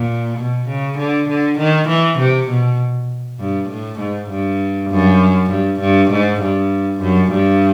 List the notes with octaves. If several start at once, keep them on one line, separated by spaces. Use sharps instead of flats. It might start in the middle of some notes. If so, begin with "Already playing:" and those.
Already playing: A#2
B2
C#3
D3
D3
D#3
E3
C3
B2
G2
A2
G#2
G2
F#2
G2
G2
G#2
G2
F#2
G2